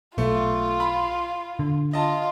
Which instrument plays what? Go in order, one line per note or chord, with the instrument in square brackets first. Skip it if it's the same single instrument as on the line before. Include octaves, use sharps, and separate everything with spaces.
[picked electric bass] B1 [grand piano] A3 [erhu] F4
[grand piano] B5
[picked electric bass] D3
[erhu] F4 [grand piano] D#5 A5